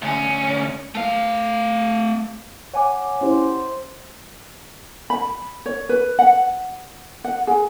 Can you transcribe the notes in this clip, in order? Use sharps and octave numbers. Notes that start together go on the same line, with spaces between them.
D2 C#4
A3 F5
C#5 F#5 G#5 D6
C#4 E4 G4 C5
B5
C#5
B4
F#5
F#5
G#4